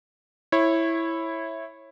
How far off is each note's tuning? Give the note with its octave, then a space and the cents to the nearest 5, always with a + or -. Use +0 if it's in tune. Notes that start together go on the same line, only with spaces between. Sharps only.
E4 +0 C#5 -20